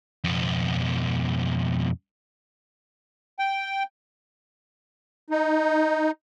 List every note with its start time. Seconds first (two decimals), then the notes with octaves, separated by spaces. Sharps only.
0.24 F2 B2
3.39 G5
5.30 D#4